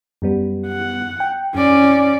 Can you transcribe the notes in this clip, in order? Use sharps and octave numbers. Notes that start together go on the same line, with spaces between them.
F#2 G3 B3
F#5
G5
F#2 C#4 D5